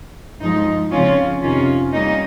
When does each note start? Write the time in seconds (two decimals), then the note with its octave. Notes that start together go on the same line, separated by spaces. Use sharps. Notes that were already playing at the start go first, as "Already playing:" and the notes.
0.40 G2 F3 G#3 D#4
0.91 C#3 F3 C4 C#4 F4
1.42 F2 C3 D#3 C#4 F4
1.93 G3 A#3 C#4 D#4